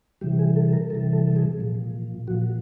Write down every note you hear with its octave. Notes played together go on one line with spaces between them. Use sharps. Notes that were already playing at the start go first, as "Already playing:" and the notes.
C3 E3 G3 G4
G#4
A4
A#4
C3 E3 G3 A4
A4
G#4
A#2 F3
A#2 F3 F#4